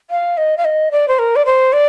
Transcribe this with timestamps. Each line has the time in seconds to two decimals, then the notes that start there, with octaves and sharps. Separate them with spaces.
0.10 F5
0.37 D#5
0.57 F5
0.65 D#5
0.91 D5
1.08 C5
1.19 A#4
1.36 D5
1.46 C5
1.73 D5